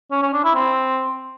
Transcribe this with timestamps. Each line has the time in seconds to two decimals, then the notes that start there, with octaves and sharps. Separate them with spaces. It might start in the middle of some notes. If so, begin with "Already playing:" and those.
0.11 C#4
0.22 C#4
0.33 D4
0.44 E4
0.55 C4